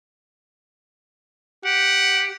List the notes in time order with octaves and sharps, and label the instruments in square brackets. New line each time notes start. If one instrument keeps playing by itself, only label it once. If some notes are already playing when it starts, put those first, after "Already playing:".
[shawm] G4 [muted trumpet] F#5